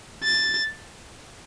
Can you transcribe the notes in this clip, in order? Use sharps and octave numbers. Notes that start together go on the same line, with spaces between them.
A6